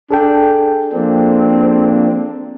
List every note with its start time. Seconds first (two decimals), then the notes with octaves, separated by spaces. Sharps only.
0.11 D4 G#4 A4 G5
0.93 F3 A#3 C4 D4